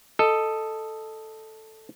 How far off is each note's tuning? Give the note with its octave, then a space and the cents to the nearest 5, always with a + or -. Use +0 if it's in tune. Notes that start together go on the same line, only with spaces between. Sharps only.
A4 +0 D#5 +0